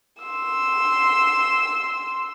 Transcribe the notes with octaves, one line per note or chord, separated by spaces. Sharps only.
C6 E6